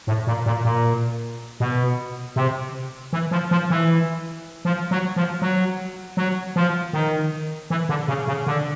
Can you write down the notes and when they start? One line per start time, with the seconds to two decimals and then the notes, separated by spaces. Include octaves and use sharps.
0.07 A2
0.27 A#2
0.46 A#2
0.65 A#2
1.60 B2
2.36 C3
3.13 E3
3.31 F3
3.51 F3
3.70 E3
4.65 F3
4.91 F#3
5.16 F3
5.42 F#3
6.17 F#3
6.56 F3
6.93 D#3
7.70 E3
7.89 D3
8.08 C#3
8.27 C#3
8.46 D3